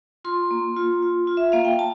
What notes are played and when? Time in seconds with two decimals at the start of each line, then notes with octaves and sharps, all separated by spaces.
0.25 F4 C6
0.51 A#3
0.76 F4
1.02 F4
1.27 F4
1.37 E5
1.52 A#3 F5
1.65 G5
1.79 A5